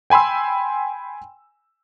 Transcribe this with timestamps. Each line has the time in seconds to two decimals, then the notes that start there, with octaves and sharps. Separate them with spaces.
0.10 G5 G#5 B5 C6 E6